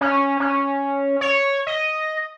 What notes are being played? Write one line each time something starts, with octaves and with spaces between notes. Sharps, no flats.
C#4
C#4
C#5
D#5